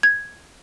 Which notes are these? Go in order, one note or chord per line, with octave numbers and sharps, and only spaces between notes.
G#6